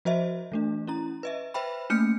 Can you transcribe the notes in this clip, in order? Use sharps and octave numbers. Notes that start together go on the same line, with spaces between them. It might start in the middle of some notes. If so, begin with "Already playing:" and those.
F3 F#4 C5 D#5 E5
E3 A3 D4
C#4 E4 A#5
B4 D#5 E5
B4 C5 E5 G5 B5
A3 A#3 C#4 F6 G6 C#7